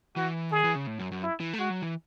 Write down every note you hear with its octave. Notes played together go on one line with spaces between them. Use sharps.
E3 F#4
D#3 G#4
E3
C#3
A2
F#2
F#2
E4
E3
A3
G#3 F#4
F#3
E3